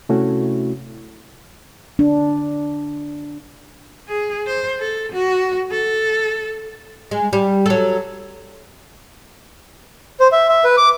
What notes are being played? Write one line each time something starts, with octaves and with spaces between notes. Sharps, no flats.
C3 A3 C#4 E4 F#4
D4
G#4
C5
A4
F#4
A4
G#3
G3
F#3 A4
C5
E5
E5
B4
D6